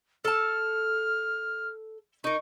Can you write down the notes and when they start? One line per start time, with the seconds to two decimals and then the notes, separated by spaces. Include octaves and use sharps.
0.25 A4 A5 F6
2.24 D#4 A#4 C#6